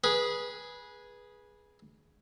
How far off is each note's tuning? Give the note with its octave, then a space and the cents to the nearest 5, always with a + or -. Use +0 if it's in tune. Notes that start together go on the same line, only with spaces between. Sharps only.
G#4 +0 B4 -20